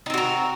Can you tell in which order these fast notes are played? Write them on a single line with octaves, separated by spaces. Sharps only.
D#4 C4 F#4 A#4